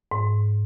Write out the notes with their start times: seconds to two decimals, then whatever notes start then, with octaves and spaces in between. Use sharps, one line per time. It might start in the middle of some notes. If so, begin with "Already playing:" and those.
0.11 G#2